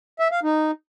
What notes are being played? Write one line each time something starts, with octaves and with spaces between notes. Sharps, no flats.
E5
F5
D#4